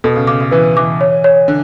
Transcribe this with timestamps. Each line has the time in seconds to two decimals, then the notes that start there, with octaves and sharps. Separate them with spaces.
0.04 B2 A4
0.16 C#3
0.27 C#3 D6
0.41 C#3
0.51 E3 B4
0.76 E3 D6
1.01 C#5
1.24 C#5
1.48 D3